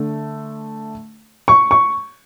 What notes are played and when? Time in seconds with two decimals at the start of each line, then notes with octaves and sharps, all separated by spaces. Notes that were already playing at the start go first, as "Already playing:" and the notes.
Already playing: D3 A3
1.48 C#6
1.71 C#6